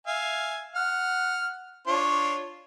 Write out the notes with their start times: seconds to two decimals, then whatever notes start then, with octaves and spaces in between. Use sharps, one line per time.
0.07 E5 F5 G#5
0.75 F#5 F6
1.87 D4 F4 C#5